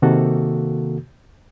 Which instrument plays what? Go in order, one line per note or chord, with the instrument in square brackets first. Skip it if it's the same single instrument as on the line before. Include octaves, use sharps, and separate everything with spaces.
[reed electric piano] C3 D#3 A#3 F#4 A4